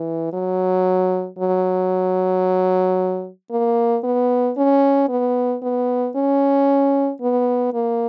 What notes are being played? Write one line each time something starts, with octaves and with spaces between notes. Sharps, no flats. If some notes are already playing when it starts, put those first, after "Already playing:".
Already playing: E3
F#3
F#3
A#3
B3
C#4
B3
B3
C#4
B3
A#3